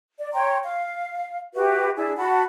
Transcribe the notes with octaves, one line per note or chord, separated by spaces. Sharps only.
D5
C#5 G5 A#5 C6
F5
F#4 G4 B4 E5
D4 E4 G#4 G#5
F#4 F#5 A5 B5